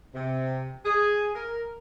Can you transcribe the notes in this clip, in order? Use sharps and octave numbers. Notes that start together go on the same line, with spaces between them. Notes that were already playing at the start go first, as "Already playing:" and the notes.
C3
G#4
A#4